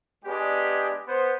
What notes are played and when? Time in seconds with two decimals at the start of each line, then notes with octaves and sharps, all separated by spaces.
0.25 G#3 B3 D4 G4 G#4
1.06 B3 C5